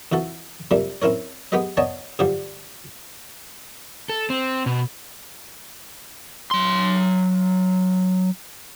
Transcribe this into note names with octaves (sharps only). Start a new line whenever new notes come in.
F2 E3 F#4 A4
C3 F3 G3 A#3 D4
C4 C#4 E4 A#4 C#5
G#3 B3 G4 G#4 B4 D#5
B3 D4 C#5 D#5 G#5 A5
G2 D3 F3 G3 D4 G4
A4
C4
B2
F#3 C6